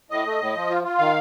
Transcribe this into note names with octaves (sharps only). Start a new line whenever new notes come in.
A2 D#5
A3
A2
F3
F4
F4
D#3 F5